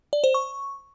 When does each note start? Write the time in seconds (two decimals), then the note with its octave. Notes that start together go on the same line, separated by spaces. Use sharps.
0.13 D5
0.24 C5
0.34 C#6